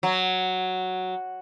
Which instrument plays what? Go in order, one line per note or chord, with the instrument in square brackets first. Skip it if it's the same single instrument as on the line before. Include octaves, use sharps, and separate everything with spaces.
[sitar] F#3